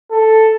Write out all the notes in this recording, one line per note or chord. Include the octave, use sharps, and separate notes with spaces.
A4